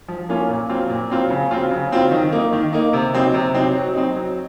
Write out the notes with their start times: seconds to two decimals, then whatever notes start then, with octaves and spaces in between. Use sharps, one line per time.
0.08 F3
0.29 A#3 C#4 F4
0.49 A#2
0.69 F#3 C4 F4
0.90 A#2
1.10 F#3 C4 F4
1.30 C#3
1.51 F#3 C4 F4
1.71 C#3
1.92 F#3 C4 F4
2.11 D#3
2.32 A#3 D#4
2.52 D#3
2.73 A#3 D#4
2.93 C3
3.14 F#3 C4 D#4
3.34 C3
3.54 F#3 C4 D#4
3.75 F#3
3.95 C4 D#4
4.15 F#3